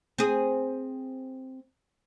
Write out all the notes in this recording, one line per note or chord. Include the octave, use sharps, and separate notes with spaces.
C4 G#4